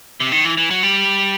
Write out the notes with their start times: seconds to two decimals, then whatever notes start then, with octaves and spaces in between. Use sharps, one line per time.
0.20 C3
0.32 D#3
0.45 E3
0.57 E3
0.70 F#3
0.83 G3